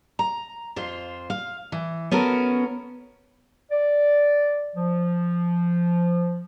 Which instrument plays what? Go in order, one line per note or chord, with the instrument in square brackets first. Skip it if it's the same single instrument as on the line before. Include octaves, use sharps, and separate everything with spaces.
[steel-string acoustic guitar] A#5
F2 F4 C5
F5
E3
B3 C#4 F#4 A4 A#4
[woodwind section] D5
F3